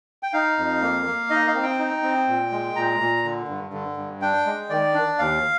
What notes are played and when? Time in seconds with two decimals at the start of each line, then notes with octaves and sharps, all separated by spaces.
0.23 G5
0.33 D#4 F5
0.58 F2
0.82 A#3
1.06 A#3
1.30 D#4 D#5
1.47 F5
1.55 C4
1.63 G5
1.79 D#4
2.03 C4
2.28 A#2
2.52 G#3
2.76 A#2 A#5
3.00 A#2
3.24 D3
3.48 G2
3.73 D3
3.97 G2
4.21 D4 G5
4.45 G#3
4.70 D#3 D5
4.94 D4
5.19 D#2 F5